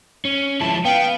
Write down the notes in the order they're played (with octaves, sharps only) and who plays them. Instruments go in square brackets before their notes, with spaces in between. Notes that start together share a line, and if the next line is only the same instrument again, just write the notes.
[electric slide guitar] C#4
[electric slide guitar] F3 G#3 E4 [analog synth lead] A5
[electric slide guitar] B3 [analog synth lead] F5 [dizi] G5